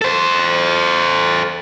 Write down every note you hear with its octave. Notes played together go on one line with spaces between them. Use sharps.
A4 C5